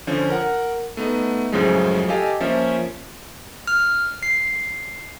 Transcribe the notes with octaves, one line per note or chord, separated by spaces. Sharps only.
D3 F3 C#4
A#4 F#5
A3 B3 D#4
F#2 A2 C#3 F3 F#3 G#3
G4 A4 D#5 F5 G#5 A5
F3 A#3 C#4 E5
F6
C7